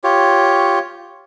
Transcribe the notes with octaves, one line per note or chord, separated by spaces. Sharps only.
F4 G4 C#5